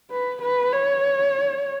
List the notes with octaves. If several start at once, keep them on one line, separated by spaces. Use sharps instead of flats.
B4
B4
C#5